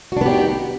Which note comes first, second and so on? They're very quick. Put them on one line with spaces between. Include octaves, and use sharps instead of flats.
F#4 D4 B3 G4 D#4